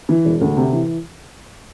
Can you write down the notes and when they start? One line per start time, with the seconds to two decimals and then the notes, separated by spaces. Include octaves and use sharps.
0.09 E3
0.25 E1
0.41 D2
0.57 C3
0.72 E3